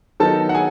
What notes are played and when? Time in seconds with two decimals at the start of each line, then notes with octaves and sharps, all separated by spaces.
0.20 D#3 F#3 B3 D#4 A4 A5
0.49 F#5
0.55 G#4 G#5